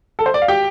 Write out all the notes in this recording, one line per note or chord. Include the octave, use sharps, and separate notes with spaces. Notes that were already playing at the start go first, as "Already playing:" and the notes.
A4
C5
D5
F5
G4 G5